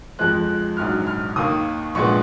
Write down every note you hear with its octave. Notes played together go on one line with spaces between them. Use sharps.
F2 F3 G#3 F#6
A#1 G#2 F#3 F6
F6
D#2 D#3 A#3 D#6
A#1 A#2 G#3 B3 C#6